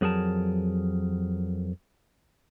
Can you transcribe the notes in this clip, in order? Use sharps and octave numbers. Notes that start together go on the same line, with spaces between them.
F2 F#3 G#4 A#4 A5